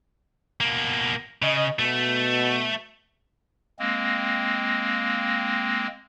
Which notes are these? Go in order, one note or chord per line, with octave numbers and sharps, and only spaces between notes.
B2 A#3
C#3 D#5
B2 A3
G#3 A#3 C4